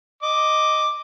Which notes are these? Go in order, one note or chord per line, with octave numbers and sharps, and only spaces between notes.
D#5 D6